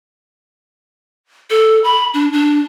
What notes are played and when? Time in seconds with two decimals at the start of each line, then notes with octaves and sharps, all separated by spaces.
1.50 A4
1.84 B5
2.14 D4
2.33 D4